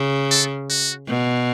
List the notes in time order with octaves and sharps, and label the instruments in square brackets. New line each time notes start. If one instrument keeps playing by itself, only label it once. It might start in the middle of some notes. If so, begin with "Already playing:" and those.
Already playing: [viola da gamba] C#3
[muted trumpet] A4
F#4
[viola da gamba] B2